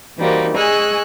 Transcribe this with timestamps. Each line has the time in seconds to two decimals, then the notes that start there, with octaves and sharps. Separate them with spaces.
0.18 E3 G3 A#3 D#4 F#4 C5
0.56 G#4 D#5 G#5 C#6 E6 F#6